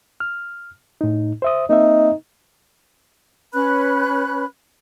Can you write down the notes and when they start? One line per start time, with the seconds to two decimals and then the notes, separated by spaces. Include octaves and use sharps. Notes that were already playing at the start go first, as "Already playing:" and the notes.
0.20 F6
1.01 A2 D#4
1.42 C5 E5 D#6
1.69 A#3 C4 D#4 E5
3.53 C#4 B4 B5 F#6